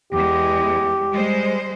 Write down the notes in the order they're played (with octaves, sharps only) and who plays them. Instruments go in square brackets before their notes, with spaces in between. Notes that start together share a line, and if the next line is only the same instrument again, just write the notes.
[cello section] E2 G#3 [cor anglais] G4
[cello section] G3 G#3 C5